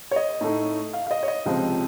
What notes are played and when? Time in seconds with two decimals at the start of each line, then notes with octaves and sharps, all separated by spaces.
0.11 C#5
0.16 D#5
0.41 A2 A3 D#4
0.93 F5
1.07 F5
1.11 D#5
1.23 C#5
1.28 D#5
1.46 C#2 C3 F3 C4